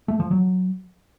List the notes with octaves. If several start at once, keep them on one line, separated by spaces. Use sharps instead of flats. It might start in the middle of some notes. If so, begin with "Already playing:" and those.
A3
F3
F#3